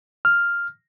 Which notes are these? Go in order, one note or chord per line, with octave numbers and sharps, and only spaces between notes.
F6